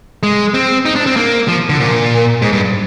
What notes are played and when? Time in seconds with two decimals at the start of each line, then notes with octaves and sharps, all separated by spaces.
0.23 G#3
0.54 C4
0.85 D#4
0.96 D4
1.06 C4
1.16 A#3
1.48 F3
1.69 D3
1.80 A#2
2.42 G#2
2.52 G2